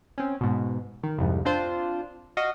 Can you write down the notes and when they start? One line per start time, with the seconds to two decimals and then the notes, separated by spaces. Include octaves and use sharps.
0.18 C4 C#4
0.41 G#2 B2
1.03 D#3
1.19 C2 F2 G#2
1.45 C4 D4 F4 C5
2.37 F#4 D#5 F5